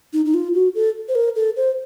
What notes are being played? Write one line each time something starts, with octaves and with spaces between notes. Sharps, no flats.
D#4
D#4
F4
F#4
A4
C5
A#4
A4
C5